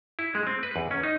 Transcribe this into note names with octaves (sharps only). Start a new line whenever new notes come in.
E4
G#3
C4
B4
E2
C#4
D#4